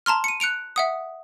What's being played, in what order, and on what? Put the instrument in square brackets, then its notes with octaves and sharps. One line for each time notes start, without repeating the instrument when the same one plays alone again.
[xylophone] A5 A#5 C6 F6
C#7 D#7
F#6 C#7 D7 F7
E5 F#5 D#6